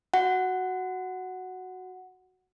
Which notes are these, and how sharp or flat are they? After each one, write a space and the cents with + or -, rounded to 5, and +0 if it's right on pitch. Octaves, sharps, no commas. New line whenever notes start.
F#4 +0 F#5 +0